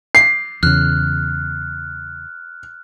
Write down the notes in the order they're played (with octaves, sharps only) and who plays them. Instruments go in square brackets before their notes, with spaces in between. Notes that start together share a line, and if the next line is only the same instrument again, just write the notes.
[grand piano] C7
[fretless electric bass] E2 C#3 [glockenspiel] F6 F#6